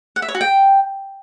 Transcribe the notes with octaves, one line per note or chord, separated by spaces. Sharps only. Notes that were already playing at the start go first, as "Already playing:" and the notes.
F#5
E5
C#5
F#4
G5